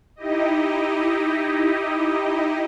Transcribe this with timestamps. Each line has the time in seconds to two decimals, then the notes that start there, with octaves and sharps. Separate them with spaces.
0.16 D#4 E4 G4 D#5